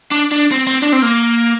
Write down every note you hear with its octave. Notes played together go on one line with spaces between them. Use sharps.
D4
D4
C4
C4
D4
C4
A#3